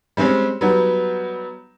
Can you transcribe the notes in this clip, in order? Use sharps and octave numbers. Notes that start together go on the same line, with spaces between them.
G3 G#3 C4 C#4
F#3 G3 B3 D#4